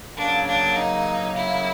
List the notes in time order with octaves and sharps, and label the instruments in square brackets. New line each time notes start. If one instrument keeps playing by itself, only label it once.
[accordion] C#3 F#3 A#3 [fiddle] D4
[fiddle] D4
D#4
E4